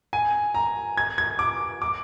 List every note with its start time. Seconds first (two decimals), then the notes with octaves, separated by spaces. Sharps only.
0.13 G#5
0.54 A#5
0.97 G#6
1.18 G#6
1.39 D6
1.82 D6